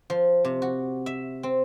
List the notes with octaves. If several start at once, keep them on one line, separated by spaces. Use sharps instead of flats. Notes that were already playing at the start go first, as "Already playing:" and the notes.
F3
C3
F#4
E5
C4